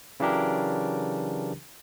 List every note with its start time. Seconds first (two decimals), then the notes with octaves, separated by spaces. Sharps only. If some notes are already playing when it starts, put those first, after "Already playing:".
0.20 C#3 E3 F#3 D4 G4 A#4